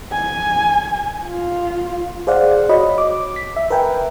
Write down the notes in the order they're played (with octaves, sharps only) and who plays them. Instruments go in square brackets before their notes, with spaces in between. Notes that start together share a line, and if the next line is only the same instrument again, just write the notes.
[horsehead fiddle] G#5
F4
[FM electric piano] G#4 C5 D5 F5 F#5
F#4 C#5 D#5 B5
D6
B6
E5
A#4 B4 E5 G5 G#5